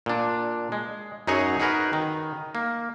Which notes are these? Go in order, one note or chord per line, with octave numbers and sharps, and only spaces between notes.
A#2 D4
G#3
F#2 F#3 D#4 G#4 C#5 G#5
D#4 F#4 G#4 A#4 B4
D#3
A#3